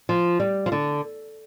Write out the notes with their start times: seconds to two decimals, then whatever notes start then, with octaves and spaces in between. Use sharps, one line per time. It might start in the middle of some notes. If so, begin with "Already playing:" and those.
0.09 F3
0.40 G3
0.66 F3
0.72 D3